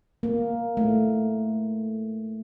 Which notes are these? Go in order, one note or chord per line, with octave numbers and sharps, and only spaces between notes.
A#3
A3